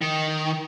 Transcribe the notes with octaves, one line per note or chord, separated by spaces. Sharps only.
D#3